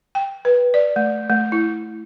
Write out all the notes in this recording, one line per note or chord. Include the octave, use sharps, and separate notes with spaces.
G5
B4
D5
A3
A3
E4